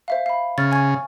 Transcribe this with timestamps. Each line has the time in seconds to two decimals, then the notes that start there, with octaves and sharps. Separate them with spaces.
0.08 C5 E5 F5
0.26 F5 B5
0.58 C#3 F6 A6
0.72 G#5 C#6 G#6